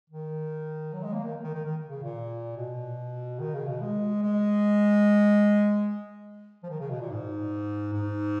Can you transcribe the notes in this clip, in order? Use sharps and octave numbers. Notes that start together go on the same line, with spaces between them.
D#3
F#3
G#3
A#3
D#3
D#3
D#3
D#3
C#3
A#2
B2
D#3
C#3
B2
G#3
G#3
F3
D#3
C#3
B2
A#2
G#2
G#2